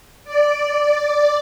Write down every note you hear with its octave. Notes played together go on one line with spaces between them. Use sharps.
D5